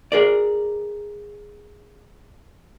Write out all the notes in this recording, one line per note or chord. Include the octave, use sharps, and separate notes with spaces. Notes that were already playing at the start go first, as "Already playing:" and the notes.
G#4 A#4 D5